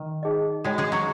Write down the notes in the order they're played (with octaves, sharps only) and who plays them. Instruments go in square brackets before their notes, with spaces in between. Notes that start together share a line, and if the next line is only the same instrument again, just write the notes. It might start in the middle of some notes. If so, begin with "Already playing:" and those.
Already playing: [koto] D#3
[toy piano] D#4 G#4 D#5
[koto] G#3 G#4 [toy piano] F#4 C#5 G#5 B5
[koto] G#3 G#4
F#3 F#4